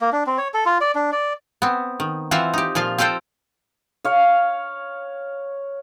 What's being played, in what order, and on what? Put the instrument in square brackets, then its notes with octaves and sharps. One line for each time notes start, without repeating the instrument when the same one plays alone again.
[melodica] A#3
D4
C4
C#5
A4
F4
D5
D4
D5
[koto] B3 C4
D#3
E3 C4 F4 C5 E5 F#5
D#4 G4
A#2 F3 F4 F5
C4 F4 A4 C5 G5
[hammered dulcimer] C#5 F5